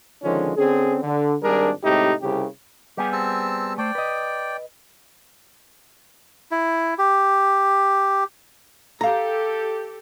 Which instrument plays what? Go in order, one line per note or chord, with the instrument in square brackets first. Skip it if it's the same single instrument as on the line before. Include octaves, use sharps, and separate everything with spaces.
[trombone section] D3 D#3 F3 G#3 C#4
D3 C4 C#4 G#4
D3
G#1 G2 G3 D4 G#4 A#4
A2 C3 G#3 D#4 E4 G4
C2 C#3 G4
[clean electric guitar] G3 B3 G#4 [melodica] G4
[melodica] C4 A5 E6
[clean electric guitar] A3 C5 [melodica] D5 G5
[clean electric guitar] B4 D#5
[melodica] E4
G4
[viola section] G4 A4 [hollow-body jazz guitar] F5 A#5